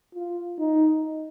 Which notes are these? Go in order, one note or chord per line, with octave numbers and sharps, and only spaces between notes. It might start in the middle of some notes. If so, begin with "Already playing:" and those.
F4
D#4